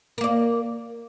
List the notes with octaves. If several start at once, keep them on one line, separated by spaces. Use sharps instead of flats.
A#3 A#4 D5